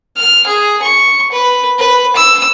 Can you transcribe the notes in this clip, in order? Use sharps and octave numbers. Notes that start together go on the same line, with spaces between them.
F6
G#4
C#6
B4
B4
E6